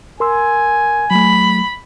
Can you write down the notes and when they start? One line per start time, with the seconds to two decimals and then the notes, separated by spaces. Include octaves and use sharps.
0.20 A#4 G#5 C6 E6
1.11 F#3 A3 B5